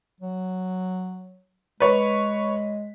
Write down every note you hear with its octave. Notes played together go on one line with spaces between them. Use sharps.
F#3
G#3 B4 C#5